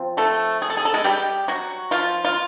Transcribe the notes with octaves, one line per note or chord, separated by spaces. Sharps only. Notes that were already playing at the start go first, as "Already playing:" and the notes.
Already playing: F3 C4
A3 A4
G#4
A4
G#4
A4
G#3 G#4
G3 G4
F#3 F#4
F3 F4
F4